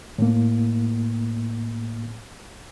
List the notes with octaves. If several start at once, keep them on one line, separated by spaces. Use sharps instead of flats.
A2 A#3